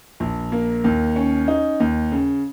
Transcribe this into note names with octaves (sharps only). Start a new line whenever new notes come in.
A#1
A#3
D#2
C#4
D#4
D#2
C#3